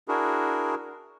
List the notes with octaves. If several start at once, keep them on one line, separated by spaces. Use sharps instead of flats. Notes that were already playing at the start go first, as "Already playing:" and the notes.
D4 E4 F#4 G#4 A#4